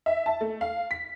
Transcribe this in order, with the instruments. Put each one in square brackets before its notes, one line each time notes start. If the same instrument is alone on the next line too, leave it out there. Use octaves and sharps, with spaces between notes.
[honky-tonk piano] E5
A5
A3
F5
B6